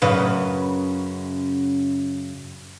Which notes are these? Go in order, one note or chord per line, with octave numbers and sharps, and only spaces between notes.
F#2 C#3 B4